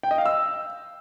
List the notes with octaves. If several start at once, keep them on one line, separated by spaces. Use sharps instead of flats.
G5
D#5
F5
E6